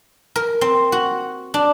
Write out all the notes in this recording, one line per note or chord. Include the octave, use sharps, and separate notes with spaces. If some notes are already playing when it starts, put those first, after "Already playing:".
A#4
C4
F#4
D4